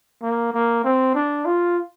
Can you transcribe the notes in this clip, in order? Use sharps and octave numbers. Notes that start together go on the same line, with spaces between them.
A#3
A#3
C4
D4
F4